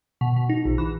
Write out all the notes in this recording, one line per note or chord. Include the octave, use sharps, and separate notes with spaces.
B2
B2
D#4
A#1
E3